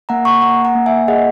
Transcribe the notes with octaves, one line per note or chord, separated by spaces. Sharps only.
A#3 F#5 A#5
A#5 C#6
A#3 F#5 A#5
F#5 A#5
A#3
E5 G#5
G#4 D#5 F#5